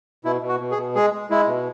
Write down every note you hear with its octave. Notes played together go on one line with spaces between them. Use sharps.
B2 E4
B2
F#4
B2
G#4
B2
G#3 G#4
G#3
G#3 E4
B2